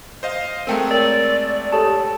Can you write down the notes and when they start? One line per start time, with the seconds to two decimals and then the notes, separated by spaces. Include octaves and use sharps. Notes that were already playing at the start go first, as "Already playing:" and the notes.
0.23 C5 D#5 F5
0.67 G#3 A3 C4 A#4 G5 A#5
0.91 A#4 C#5 D5 A#5
1.72 G4 A4 C#5 A5